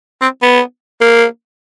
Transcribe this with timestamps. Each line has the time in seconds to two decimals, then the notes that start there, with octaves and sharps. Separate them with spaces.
0.21 C4
0.42 B3
1.01 A#3